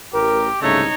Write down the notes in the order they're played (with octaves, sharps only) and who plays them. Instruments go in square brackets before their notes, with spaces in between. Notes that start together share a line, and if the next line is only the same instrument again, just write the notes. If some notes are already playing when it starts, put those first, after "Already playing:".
[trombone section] A1 A#4 [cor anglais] G4
[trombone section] C2 G#2 C#3 [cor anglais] A3 [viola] D#4 C#5